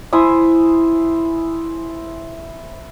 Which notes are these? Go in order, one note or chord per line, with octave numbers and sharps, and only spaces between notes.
E4 C5 G#5 D#6